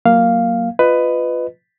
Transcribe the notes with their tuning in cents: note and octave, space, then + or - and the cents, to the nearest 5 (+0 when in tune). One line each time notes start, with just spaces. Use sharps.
F#3 +0 A#3 +0 F5 +0
F4 +0 B4 +15 D#5 -10